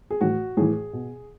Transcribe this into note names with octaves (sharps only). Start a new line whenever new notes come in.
G#4
A2 E3 F#4
A2 E3 G#4
B2